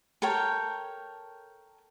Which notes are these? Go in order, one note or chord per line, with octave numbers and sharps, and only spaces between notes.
A4 A#4 C#5 G5